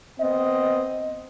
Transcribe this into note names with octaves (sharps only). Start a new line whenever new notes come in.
B3 C4 D#5